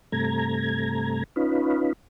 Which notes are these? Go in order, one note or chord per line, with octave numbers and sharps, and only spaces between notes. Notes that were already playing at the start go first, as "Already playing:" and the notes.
G2 C3 A3 A#5 G#6
C#4 D#4 F4 B4